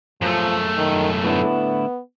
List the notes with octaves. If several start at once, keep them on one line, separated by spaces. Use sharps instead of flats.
F#2 F3 A3
D#3
A2 D3 B3 E4